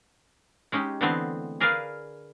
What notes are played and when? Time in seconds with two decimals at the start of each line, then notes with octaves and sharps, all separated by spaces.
0.72 G#3 C#4 D#4 G4
1.01 D3 E3 G#3 A3 B3 C4
1.60 G#4 A#4 B4 D5 F5